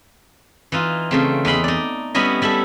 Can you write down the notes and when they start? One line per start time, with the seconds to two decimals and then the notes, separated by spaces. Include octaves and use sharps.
0.72 E3 D#4 F4
1.11 C#3 A3 C4
1.45 E2 D#4 B5 C6
1.64 D#4 D5
2.14 G3 B3 C#4 E4 D#5
2.42 G3 E4 A4 E5